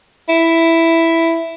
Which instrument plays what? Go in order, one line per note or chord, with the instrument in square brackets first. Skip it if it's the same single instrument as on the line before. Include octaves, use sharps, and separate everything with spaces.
[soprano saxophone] E4